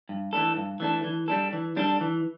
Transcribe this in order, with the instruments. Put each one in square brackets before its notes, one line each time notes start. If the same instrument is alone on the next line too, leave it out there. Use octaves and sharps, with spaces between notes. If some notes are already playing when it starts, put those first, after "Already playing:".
[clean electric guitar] G2
E3 A3 D4 A4
G2
E3 A3 D4 A4
E3
G3 D4 A4
E3
G3 D4 A4
E3